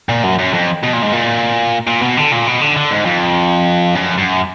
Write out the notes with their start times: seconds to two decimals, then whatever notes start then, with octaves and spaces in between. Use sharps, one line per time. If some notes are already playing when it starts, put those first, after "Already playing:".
0.09 A#2
0.24 F#2
0.39 F#2
0.53 F2
0.83 B2
0.93 A#2
1.02 G#2
1.12 A#2
1.87 A#2
2.02 B2
2.17 D3
2.32 A#2
2.47 B2
2.61 D3
2.77 D3
2.91 G#2
3.06 F2
3.95 F#2
4.17 F#2